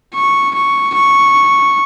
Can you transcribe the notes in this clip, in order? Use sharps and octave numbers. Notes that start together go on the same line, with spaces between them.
C#6
C#6
C#6